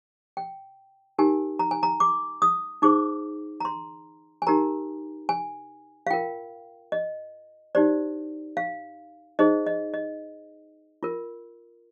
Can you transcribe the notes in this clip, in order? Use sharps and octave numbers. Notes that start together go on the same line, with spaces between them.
G5
D#4 G4 A#4 G#5
A#5
G#5
A#5
D6
D#6
D#4 G#4 C5 D6
A#5
C6
G#5
D#4 G4 A#4 A#5
G#5
F5
F4 A#4 G5
D#5
D#4 G4 C5 D5
F5
D#4 G#4 C5 D#5
D#5
D#5
F4 A#4